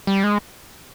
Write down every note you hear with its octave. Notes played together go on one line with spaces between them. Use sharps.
G3
G#3